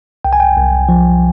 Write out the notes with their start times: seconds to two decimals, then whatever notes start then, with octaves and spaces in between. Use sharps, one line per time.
0.24 C2 G5
0.33 G#5
0.40 G5
0.57 C2
0.89 F3